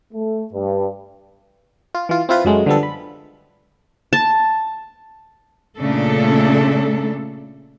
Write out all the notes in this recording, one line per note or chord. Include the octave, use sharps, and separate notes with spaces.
A3
G2
F4
E3 F4
C4 E4 F4 B4
F#2 F#3 G#3 A3
D3 F3 G3 B3 A4
B5
A5
A#2 C#3 A3 D4 A4